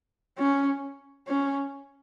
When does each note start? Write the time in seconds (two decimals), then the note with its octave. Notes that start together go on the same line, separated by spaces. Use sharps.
0.38 C#4
1.28 C#4